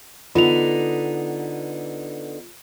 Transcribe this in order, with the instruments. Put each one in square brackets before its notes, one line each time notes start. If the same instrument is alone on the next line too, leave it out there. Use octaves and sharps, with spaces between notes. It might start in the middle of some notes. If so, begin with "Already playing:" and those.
[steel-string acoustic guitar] D3 B3 D#4 [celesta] F4 F7